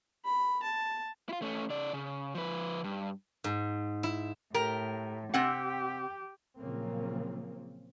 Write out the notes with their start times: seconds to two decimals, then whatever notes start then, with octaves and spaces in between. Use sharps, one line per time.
0.25 B5
0.63 A5
1.29 E4 F4
1.42 A3 C#4
1.70 C#3 D5
1.93 C#3
2.34 F3 B4
2.84 G2
3.44 G#2
4.03 E4
4.54 A2 G4 A#4
5.34 C3 C4 G4 F#5
6.58 A#2 C#3 F3 F#3 A#3 C4